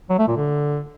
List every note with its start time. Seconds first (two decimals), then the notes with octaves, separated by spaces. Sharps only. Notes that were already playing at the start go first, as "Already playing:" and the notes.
0.10 F#3
0.19 A3
0.28 A#2
0.36 D3